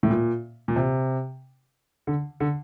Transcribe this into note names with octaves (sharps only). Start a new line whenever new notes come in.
A2
A#2
A#2
C3
D3
D3